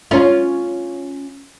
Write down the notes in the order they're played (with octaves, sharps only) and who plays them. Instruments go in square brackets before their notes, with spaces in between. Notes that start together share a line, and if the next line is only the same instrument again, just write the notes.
[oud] C#4 F4